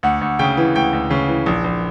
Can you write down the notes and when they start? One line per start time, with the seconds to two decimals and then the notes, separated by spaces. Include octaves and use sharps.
0.03 D2 F#5
0.21 D2
0.39 C#3 G5
0.57 E3
0.75 D2 G5
0.93 D2
1.11 C#3
1.28 E3
1.46 A#1
1.64 A#1